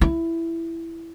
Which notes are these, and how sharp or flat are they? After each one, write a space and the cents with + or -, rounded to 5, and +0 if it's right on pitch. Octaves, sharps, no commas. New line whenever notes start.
E4 +10